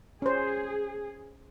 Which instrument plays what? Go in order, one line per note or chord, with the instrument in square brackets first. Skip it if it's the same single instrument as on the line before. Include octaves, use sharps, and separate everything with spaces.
[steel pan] C#4 C5 [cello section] G#4